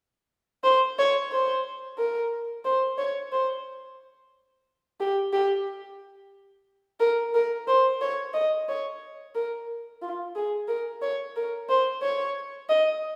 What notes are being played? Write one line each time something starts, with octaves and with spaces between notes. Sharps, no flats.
C5
C#5
C5
A#4
C5
C#5
C5
G4
G4
A#4
A#4
C5
C#5
D#5
C#5
A#4
F4
G#4
A#4
C#5
A#4
C5
C#5
D#5